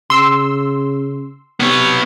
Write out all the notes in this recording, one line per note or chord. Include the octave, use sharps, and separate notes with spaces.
C#3 C6 E6
C3 B3 C#5